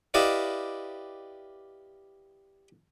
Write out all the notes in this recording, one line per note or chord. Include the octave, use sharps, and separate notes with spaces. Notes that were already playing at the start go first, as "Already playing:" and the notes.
E4 G4 B4 D5 D#5 F5